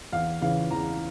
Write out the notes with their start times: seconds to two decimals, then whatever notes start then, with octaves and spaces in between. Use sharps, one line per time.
0.12 E2 F5
0.42 C#3 E3 F5
0.70 E2 A#5